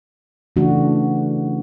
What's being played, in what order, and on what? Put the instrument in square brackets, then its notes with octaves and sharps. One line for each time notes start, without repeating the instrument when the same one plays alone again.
[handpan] C#3 E3 A3 D4 F#4